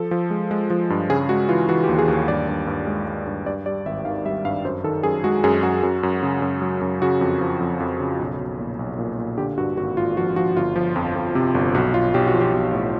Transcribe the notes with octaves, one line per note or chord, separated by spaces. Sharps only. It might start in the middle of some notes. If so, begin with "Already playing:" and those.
Already playing: F3 A4
F3
G#3
G#3
F3
G2
C#3 G#4
G#3 F#4
E3 F4
E3 F#4
G4
D#2
G#4
D#2
G#4
G2 D5
G2
G2
G#3
G#3
G2
G2 D5
G3 D5
G#1 E5
D#3 F5
G3 E5
G2 F5
F#2 C5
D#3 A4
F#2 G#4
G#3 F#4
F#2 G#4
F#2 F#4
F#2
F#2
C#3
F#2
F#3
F#2
C#3 F#4
F2
F3
F2
F2
C#3
B1
B1
A#2
B1
A#2
A#2
D3 G4
G2 F#4
G#1 F#4
G#1 F4
F3 F#4
F3 F#4
G1 F4
F3
F2
F2
C3
G1
B1 F#4
B1 F4
B1 G4
F#4
F3
G4
B1
A2